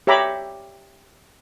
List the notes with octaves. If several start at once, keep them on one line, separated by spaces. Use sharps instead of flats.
G4 C#5 E5 A#5 B5 D6